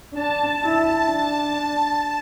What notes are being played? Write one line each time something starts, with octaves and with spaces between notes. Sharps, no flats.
D4 A5
E4
D4 A5